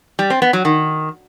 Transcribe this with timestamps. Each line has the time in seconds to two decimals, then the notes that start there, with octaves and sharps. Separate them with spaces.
0.19 G3
0.30 C4
0.42 B3
0.53 F#3
0.65 D#3